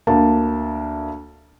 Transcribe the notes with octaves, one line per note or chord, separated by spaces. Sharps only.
D2 A#3 F5 A5